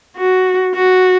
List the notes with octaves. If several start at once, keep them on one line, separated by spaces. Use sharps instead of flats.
F#4
F#4